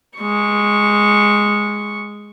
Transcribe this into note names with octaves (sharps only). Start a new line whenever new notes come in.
G#3 C#6